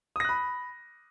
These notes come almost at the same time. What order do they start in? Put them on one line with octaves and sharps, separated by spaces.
D#6 A#6 F#6 B5